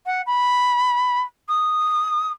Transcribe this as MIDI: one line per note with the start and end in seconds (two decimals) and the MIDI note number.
0.06 0.22 78
0.26 1.21 83
1.48 2.30 87